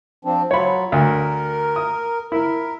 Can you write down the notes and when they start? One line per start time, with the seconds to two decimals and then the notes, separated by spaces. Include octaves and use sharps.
0.25 F3 C4 D4
0.51 F#3 F4 C#5 B5
0.92 D2 A#4
1.76 D#6
2.32 E4 A#4